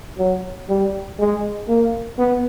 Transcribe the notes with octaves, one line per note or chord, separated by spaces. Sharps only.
F#3
G3
G#3
A#3
B3